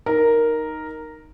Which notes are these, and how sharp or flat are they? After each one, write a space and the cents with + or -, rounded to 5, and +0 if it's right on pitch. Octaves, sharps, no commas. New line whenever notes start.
D#4 +0 A#4 +0